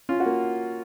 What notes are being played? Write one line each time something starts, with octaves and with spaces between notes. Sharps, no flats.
C#4 F4
F#4
A#3